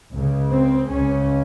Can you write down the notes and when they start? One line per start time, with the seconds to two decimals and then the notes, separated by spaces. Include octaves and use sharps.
0.13 C#2 C#3
0.51 C4
0.91 C#2 C#3 C#4